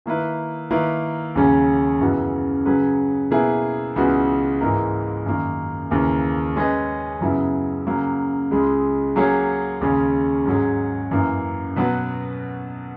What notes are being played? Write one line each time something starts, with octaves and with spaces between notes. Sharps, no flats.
D#3 A#3 E4 B4
D#3 A#3 E4 B4
D#2 C#3 F#3 C#4 G#4
F#2 C#3 E3 B3 F#4
C#3 F#3 C#4 G#4 B4
B2 A#3 E4 G#4 B4
C#2 C#3 E3 B3 F#4
G#2 E3 A#3 D#4 A#4
F#2 D#3 A#3
D#2 C#3 E3 A#3
G#3 C#4 G#4 B4 D#5
F#2 C#3 F#3 B3 E4
C#3 F#3 A#3
C#2 C#3 G#3
F#3 A#3 C#4 G#4 C#5
D#2 C#3 G#3 C#4
G#2 F#3 C#4 G#4
F#2 E3 A#3
B2 F#3 B3 F#4 B4